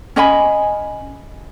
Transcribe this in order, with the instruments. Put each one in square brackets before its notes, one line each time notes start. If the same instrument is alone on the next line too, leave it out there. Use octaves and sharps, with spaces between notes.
[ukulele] C#4 D#5 G#5 B5